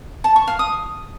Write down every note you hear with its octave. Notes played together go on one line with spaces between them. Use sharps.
A5
C#6
F5
D#6